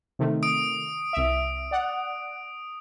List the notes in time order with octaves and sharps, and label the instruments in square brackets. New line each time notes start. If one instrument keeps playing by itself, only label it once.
[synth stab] C3 D#3 A3
[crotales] D#6 D7
[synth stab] C2 E5
D5 F#5